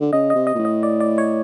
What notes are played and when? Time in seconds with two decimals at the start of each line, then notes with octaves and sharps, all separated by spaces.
0.01 D3
0.13 C#3 D#5
0.30 C3 D#5
0.47 D#5
0.54 A#2
0.58 A2
0.65 D#5
0.83 D5
1.00 D5
1.18 C#5